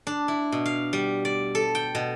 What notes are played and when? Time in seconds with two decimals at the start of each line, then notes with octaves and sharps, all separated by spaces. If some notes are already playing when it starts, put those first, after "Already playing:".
0.07 D4
0.28 E4
0.52 B2
0.66 F5
0.93 G3
1.25 D5
1.55 A4
1.75 G5
1.95 B2